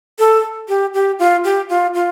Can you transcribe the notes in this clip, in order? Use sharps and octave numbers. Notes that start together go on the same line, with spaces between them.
A4
G4
G4
F4
G4
F4
F4